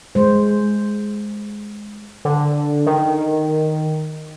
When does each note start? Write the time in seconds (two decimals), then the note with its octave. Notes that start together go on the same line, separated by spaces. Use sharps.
0.15 G#3 C5
2.25 D3
2.86 D#3